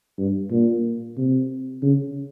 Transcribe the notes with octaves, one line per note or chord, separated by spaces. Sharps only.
G2
A#2
C3
C#3